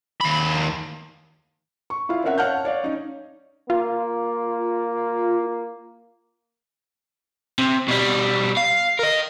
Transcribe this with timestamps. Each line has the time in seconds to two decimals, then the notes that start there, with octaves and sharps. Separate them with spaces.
0.21 D#2 B5
1.90 C#6
2.09 E4 F4 F5
2.24 C4 C#4 A#4 C#5 E5 F#5
2.38 C#5 F5 F#5 A5 F6 G6
2.65 C#5 D5 F5
2.84 C#4 D#4
3.70 A#3 F4
7.58 C3
7.88 B2 G3
8.57 F5
8.99 A#4 D#5